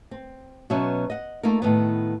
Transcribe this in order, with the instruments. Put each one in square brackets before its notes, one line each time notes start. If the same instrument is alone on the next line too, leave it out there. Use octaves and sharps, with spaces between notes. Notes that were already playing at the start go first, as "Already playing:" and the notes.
[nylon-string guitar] C4
B2 F#3 B3 C#4 E5
D#5 F#5
A3 A#3 D#4 F4 A#4
A2 D#3 B3